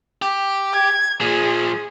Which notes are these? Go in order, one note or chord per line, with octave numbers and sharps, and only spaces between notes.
G4
G#6
A#2 F3 G#4